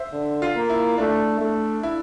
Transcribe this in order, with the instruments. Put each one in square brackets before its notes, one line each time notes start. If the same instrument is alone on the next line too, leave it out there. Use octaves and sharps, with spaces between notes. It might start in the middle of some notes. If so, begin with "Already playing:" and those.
Already playing: [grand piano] C5 E5
[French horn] D3
[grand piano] F4
[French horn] A#3
[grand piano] E4
[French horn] A3 [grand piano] D4
[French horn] A3
[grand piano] E4